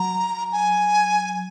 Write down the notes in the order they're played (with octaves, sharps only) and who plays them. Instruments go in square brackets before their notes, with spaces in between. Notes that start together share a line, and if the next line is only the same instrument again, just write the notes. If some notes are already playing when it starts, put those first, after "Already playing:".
Already playing: [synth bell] F#3 [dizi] A#5
[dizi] G#5